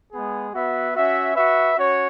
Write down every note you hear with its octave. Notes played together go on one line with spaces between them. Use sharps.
G#3 B3 G#4
B3 F#4 B4 E5
C#4 F#4 E5
F#4 B4 E5
C#4 F#4 C#5